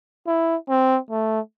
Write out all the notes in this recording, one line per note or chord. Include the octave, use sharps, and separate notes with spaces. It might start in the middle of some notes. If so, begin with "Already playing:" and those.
E4
C4
A3